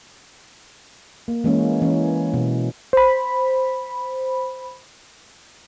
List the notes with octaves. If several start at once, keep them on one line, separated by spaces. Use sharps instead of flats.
A#3
E3 G#3 A#3 C#4
E3 C#4
B2
C5 B5